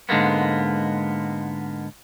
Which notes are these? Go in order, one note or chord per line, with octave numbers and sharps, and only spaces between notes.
G#2 D3 G#3 A#3 B3